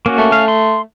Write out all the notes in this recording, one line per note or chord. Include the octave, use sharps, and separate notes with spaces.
A#3 C#4 F#4
A3
C#4 F5
C6